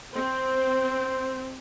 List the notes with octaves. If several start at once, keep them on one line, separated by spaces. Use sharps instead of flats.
C4 C5